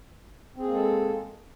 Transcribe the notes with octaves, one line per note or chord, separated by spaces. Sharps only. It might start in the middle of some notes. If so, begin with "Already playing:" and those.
G#3 A#3 C4 G#4 A4